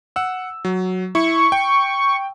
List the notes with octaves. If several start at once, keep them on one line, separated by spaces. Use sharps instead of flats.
F#5 E6
F#3
E4 C#6
G5